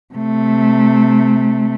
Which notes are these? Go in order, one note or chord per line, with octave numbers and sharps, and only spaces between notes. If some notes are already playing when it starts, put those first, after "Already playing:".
C3 A3